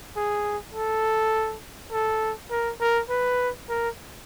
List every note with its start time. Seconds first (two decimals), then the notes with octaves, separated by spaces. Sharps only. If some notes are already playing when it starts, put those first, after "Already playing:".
0.16 G#4
0.75 A4
1.92 A4
2.51 A#4
2.80 A#4
3.09 B4
3.69 A#4